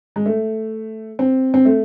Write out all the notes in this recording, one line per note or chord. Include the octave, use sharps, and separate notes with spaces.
G#3
A3
C4
C4
A3